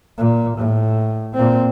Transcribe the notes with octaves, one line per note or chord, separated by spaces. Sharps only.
A#2
A2
A#2 C4